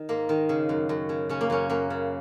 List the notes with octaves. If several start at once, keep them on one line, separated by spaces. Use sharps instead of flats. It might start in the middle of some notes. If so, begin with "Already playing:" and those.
Already playing: D#3
G#2 A#3
D#3
C#3
F#2
F#2
C#3
C#3 C#4
A#3
F#2 C#4
F#2 A#3
C#3